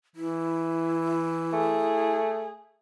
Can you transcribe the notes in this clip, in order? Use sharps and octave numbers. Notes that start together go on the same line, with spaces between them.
E3 E4
A3 G#4